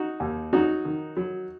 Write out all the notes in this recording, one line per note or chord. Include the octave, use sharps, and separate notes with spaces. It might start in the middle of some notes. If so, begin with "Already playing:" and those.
Already playing: D#4 F#4
D#2
F#3 D#4 F#4
D#3
F#3